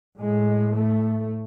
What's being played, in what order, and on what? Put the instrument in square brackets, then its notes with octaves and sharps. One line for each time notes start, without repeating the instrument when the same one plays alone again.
[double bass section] A2 G#3
A3